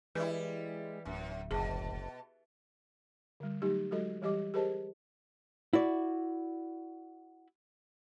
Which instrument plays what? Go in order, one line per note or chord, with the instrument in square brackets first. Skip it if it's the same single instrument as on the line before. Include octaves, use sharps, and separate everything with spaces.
[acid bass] E3 [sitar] G3 E4 [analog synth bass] G#3 [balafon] B4
[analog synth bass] D1 [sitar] F#2
[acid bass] F#1 [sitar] B2 [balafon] G#4
[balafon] D3 G3
F#3 A3 D#4 G4
F#3 G#3 F#4 A4 D#5
E3 G3 G4 D#5 D6
G4 G#4 A#4 C5 D#5 A5
[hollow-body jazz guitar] E4 F#4 D5